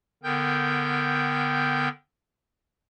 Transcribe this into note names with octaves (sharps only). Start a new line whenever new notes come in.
D3 B3 A#4 G5 G6